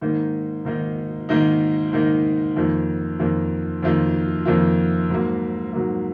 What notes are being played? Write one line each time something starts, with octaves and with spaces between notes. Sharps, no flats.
G#2 D#3 A#3 D#4
G#2 D#3 A#3 D#4
G#2 D#3 A#3 D#4
G#2 D#3 A#3 D#4
F2 D#3 A#3 F4
F2 D#3 A#3 F4
F2 D#3 A#3 F4
F2 D#3 A#3 F4
G#2 F#3 A#3
G#2 F#3 A#3